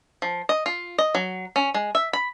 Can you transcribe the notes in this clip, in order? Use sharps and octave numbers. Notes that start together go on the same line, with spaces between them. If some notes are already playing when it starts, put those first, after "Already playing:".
F3
D#5
F4
D#5
F#3
C#4
G#3
E5
B5